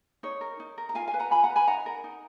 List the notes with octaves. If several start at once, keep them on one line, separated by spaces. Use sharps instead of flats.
D#4 C#5
A#4
D#4
A#4
A#5
F4 F5 G#5
F5 G#5
B4
F#5 A#5
F4 G#5 B5
F#5 A#5
B4
G#5 B5
D#4 F#5 A#5
A#4
D#4